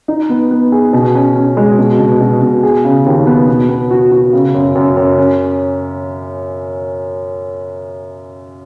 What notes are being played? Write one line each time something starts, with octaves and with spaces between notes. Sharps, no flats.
D#4
B3
B3
G#4
B2
C#4
C#4
G#3
B2
B2
B2
B2
G#4
C#3
D#2
B3
B2
B3
F#4
F#4
C#3
F#2
F#2
F#2
C#4